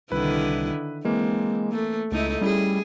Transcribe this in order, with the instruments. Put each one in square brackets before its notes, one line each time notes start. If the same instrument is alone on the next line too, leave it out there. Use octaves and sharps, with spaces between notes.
[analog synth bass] C2 [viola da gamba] D3 D#3 E4 [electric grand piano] B4
[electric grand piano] E3 A#3 [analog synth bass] G#3 [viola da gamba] C4
[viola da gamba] A3
[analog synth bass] C#2 [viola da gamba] A3 D#4 E4
[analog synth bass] G3 [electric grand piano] C#4 E4 [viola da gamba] G#4